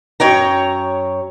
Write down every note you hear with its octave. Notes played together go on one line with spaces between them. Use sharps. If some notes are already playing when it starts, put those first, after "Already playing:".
F#2 C#5 G5 A#5